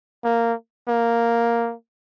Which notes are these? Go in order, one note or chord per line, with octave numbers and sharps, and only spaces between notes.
A#3
A#3